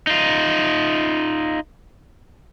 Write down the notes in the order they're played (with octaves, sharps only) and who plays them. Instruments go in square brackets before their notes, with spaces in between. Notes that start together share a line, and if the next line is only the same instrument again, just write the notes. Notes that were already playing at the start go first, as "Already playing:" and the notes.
[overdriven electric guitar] D#4 F4